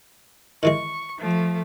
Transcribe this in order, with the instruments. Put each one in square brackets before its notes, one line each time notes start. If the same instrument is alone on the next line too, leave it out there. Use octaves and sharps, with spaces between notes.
[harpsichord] D#3 E3 G#3 [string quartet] C#6
[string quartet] F3 A3